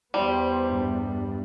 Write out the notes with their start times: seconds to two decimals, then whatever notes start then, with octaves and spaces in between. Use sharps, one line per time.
0.14 E2 G3 B3 C5
0.69 G2